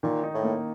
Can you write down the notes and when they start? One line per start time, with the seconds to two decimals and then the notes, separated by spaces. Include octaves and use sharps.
0.03 A#2 D#3
0.23 D#4
0.34 A2
0.43 A#3